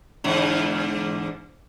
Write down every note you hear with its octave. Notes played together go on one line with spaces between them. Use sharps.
E2 G#2 D3